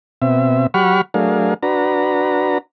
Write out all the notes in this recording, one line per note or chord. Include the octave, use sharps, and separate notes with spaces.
B2 C4 E5
F#3 G4 F#5 B5 C#6 F6
F#3 A3 D4 G#4 A#4 F5
D4 F#4 B4 A#5